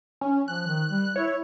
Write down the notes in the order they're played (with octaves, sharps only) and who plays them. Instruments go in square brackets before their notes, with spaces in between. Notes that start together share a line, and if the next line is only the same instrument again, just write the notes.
[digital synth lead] C#4
[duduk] F3 [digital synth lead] F#6
[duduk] D#3
G3
[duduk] E4 [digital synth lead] C#5